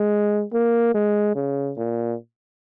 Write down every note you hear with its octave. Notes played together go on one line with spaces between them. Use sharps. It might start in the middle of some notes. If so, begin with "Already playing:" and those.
Already playing: G#3
A#3
G#3
C#3
A#2